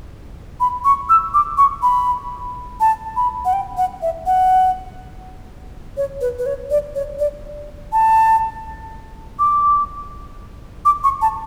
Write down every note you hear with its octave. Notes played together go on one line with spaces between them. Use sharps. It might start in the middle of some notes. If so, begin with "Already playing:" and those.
B5
C#6
E6
D6
C#6
B5
A5
B5
F#5
G5
F#5
E5
F#5
C#5
B4
B4
C#5
D5
C#5
D5
A5
D6
D6
C#6
A5